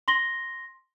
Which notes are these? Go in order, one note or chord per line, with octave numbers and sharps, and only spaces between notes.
C6 A#6 G7